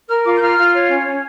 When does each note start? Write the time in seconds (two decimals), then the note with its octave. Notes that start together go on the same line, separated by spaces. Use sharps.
0.09 A#4 F6
0.25 F4 D6
0.37 G6
0.41 F4 F6
0.57 F4
0.73 C#5
0.89 C#4
1.06 C#4